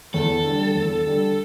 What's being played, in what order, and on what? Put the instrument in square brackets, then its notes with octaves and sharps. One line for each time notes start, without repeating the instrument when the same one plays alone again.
[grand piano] E2 [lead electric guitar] A4
[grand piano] D3
G3
E2
D3 G3